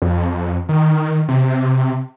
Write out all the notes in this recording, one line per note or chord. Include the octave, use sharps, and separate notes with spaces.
F2
D#3
C3